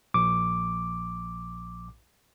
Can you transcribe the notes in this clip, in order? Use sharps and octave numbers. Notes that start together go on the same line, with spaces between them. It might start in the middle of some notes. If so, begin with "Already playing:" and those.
A#1 D6